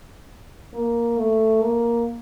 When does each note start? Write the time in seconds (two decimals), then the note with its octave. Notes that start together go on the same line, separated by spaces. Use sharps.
0.74 A#3
1.18 A3
1.62 A#3